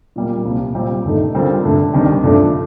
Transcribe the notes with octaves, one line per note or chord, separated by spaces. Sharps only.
A#2 G3 A#3
C2 A#2 F3
A#2 G3 C4 G4
G2 D#3 A3 D#4
D3 G3 C4 F4 A#4
G2 D3 A3
C2 C3 D#3 G3 D4
G2 F3 A3 D4